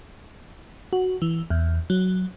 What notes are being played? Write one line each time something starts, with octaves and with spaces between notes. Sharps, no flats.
F#4
E3
E2
F#3